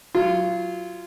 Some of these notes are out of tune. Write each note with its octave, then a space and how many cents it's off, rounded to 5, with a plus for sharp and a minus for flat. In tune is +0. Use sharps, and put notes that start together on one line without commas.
F#3 -10 F4 -20